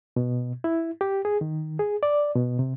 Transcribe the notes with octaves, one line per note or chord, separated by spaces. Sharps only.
B2
E4
G4
G#4
D#3
G#4
D5
B2
C3